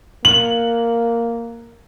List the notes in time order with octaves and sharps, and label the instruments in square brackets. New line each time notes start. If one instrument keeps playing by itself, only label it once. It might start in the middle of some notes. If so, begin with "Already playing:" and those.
[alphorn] A#3 [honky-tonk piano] F#7